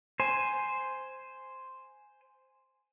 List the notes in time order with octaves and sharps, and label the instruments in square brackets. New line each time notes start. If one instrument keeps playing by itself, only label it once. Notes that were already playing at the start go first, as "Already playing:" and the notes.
[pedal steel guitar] C5 G#5